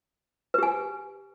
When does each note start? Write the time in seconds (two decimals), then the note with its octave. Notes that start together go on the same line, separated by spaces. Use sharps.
0.54 B4
0.58 G4
0.63 G#5